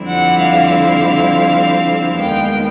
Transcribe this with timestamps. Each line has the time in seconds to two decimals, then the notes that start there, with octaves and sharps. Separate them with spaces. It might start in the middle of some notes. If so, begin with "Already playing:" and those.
Already playing: F2 D3 G3 C4 E4
0.09 F#5
0.39 F5
0.69 F5
2.22 D#2 D#3 G#3 B3 G5